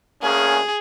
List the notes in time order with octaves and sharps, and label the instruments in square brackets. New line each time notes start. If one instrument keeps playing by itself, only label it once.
[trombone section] D2 A#3 C#4 [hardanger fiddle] G#4